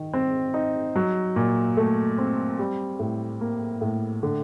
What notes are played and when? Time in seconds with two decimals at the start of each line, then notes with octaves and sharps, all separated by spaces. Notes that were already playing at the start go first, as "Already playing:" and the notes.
Already playing: D#3
0.13 C4
0.54 D#4
0.96 F#3
1.36 A#2
1.77 A3
2.18 C4
2.59 G3
2.99 A2
3.41 A#3
3.81 A2
4.23 D3